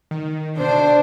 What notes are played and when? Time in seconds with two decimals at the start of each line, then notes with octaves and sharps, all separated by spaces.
0.11 D#3
0.57 B2 D3 D4 C5